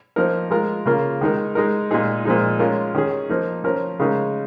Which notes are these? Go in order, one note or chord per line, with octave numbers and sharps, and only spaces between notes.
F3 A#3 D#4 A#4
G#3 F4 A#4
C#3 A#3 F4 A#4
D#3 G#3 D#4 A#4
G#3 D#4 A#4
A#2 G#3 D#4 G#4
A#2 F3 G#3 D#4
G#3 C#4 F4 A#4
D#3 C#4 G#4
F3 A#3 D#4
F3 C#4 A#4
C#3 G#3 D#4 A#4